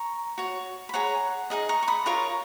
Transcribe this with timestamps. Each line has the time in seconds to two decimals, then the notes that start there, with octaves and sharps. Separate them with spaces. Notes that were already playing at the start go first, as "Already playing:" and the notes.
Already playing: A#5 C#6
0.38 F#4 C#5
0.89 B5
0.94 G#4 C#5 F#5 A#5
1.50 D#4 G#4 D#5
1.69 A#5 C#6
1.83 C#6
1.88 B5 D#6
2.06 F4 A#4 C#5 A#5 C#6